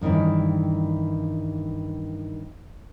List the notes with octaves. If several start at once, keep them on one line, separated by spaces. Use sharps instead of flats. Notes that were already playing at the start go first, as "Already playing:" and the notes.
G2 D#3 E3 C#4 E4